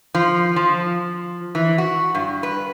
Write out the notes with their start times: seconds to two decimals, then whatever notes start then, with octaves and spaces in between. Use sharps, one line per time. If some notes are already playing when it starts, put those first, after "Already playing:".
0.15 F3
0.56 F3
1.55 E3
1.78 F#4
2.15 G2
2.43 B4